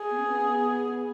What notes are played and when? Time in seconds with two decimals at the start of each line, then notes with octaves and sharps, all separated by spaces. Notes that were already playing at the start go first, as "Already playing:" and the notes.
Already playing: G#4
0.10 B3
0.18 C#4
0.26 B3